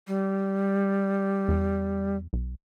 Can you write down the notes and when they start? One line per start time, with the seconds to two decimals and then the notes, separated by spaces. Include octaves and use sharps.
0.08 G3
1.48 E2
2.33 B1